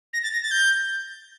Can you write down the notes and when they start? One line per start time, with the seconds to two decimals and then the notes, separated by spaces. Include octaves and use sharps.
0.13 A#6
0.23 A6
0.33 A#6
0.43 A6
0.51 G6